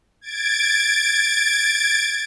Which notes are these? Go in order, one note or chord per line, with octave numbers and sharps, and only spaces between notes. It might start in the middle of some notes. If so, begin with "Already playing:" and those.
G#6 A6 D7